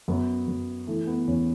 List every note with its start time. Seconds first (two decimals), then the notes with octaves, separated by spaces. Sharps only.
0.08 F#2 B3
0.48 F#2
0.87 E3 A3
1.07 B3
1.28 E2 C#4